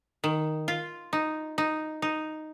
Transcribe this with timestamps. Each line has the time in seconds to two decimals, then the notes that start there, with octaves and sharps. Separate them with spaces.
0.24 D#3
0.68 F4
1.13 D#4
1.58 D#4
2.02 D#4